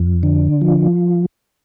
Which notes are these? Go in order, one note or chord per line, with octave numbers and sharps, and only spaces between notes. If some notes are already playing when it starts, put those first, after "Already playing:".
Already playing: F2
D3
F3